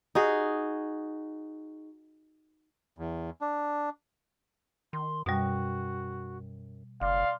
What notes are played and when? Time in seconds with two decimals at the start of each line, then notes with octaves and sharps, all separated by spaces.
0.15 D#4 F#4 G#4
2.98 E2
3.41 D4
4.93 D#3 C6
5.26 F#2 B2 G3 F#4
7.01 F#1 D5 F5 C6